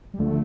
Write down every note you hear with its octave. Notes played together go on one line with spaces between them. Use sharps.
G3
D2 D3 F3 A3